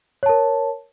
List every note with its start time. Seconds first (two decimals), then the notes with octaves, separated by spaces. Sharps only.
0.23 C#5
0.26 A5
0.29 A#4